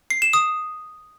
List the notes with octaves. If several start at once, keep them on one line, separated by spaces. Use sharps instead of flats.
C7
E7
D#6